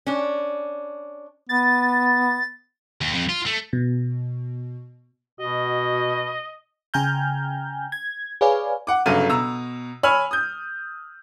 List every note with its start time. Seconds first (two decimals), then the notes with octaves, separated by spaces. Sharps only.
0.07 C#4 D4
1.49 B3 A6
3.01 D#2
3.14 F2
3.29 F4
3.46 A3
3.73 B2
5.40 B2 F#4 D#5
6.94 C#3 G5 G#5 A#5 F6 G6
7.92 G#6
8.41 G#4 B4 C#5 D5 F5 G#5
8.87 F#5 D6
9.06 G1 C#3 F#3 A4 F5 D#7
9.29 B2 A#5 E6
10.03 C#5 G#5 B5 E6 F6
10.31 D#6 G6